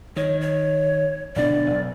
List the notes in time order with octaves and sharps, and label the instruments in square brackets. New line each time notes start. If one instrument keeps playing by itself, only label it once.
[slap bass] D#3 [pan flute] C#5
[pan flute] C#5
[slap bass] D1 B2 D4 [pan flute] D5
[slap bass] B1